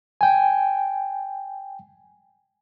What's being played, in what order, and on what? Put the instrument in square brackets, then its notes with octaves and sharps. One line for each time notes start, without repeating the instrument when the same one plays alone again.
[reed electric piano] G5 G#5